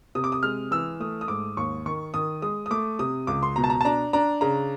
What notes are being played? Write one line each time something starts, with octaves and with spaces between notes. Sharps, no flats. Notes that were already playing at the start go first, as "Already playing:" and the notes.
C3 D#6
D6
D#6
G#3 F6
E3 E6
A3 D#6
D#6
G#2 D6
D#2 C#6
D#3 C#6
D#3 D#6
G#3 D#6
D#6
A3 D6
C3 D#6
C#2 D6
C6
B2 A#5
A5
A#5
A5
D4 A#5
D4 A#5
C#3 A#5